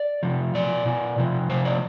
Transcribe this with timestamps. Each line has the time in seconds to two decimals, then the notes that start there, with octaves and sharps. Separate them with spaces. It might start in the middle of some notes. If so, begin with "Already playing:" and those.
Already playing: D5
0.23 C3 F3
0.54 B2 D5
0.86 B2
1.18 C3 F3
1.49 C3 F3 C5
1.65 D5